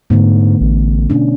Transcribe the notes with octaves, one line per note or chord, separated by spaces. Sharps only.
G#2 D3 A3 B3
A1
B2 C#4 D4